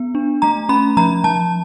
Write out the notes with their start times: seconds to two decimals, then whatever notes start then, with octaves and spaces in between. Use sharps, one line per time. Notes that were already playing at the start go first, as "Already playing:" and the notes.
Already playing: B3
0.15 D4
0.42 A3 A#5
0.69 C#4 B5
0.97 F3 A#5
1.24 F3 A5